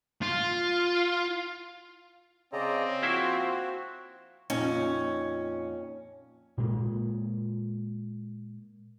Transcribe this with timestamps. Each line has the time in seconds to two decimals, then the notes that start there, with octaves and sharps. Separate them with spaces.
0.22 F4
2.53 C#3 C4 D5 D#5 A#5
3.03 F3 A#3 E4 F#4 C5
4.50 F2 A#2 C#4 D#4
6.58 A#2 G#3 A#3